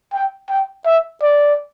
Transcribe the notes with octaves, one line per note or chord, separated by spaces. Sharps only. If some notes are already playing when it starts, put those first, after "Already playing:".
G5
G5
E5
D5